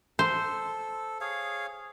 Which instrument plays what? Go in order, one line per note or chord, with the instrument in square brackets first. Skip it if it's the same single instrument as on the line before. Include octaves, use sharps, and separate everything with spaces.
[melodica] A4 [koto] C5
[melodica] G#4 C#5 F5